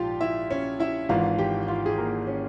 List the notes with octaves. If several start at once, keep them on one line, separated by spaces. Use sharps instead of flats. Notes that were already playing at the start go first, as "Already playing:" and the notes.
Already playing: A#1 G#2 F3 F4 G4 F5 G5
E4 E5
C#4 C#5
E4 E5
G#1 G#2 E3 F4 F5
G4 G5
F4 F5
G#4
A#3 A#4
C#4 C#5